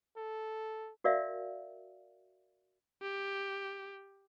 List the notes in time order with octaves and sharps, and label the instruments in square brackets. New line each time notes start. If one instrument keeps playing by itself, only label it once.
[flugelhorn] A4
[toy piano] F#4 A#4 D5 E5 F5
[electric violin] G4